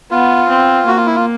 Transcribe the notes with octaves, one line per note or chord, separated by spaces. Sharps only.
B3 F4
C4
A#3 F#4
F4
E4
F4